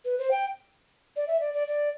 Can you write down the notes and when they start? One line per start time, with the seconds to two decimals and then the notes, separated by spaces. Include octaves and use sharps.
0.05 B4
0.18 C5
0.31 G5
1.16 D5
1.27 E5
1.40 D5
1.54 D5
1.68 D5